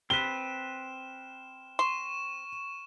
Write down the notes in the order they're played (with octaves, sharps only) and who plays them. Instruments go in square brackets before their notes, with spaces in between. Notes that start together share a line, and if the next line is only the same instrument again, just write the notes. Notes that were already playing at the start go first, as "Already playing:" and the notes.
[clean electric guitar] C4 B4 [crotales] F6 E7 [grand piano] G7
[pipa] C6 [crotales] C#6 E7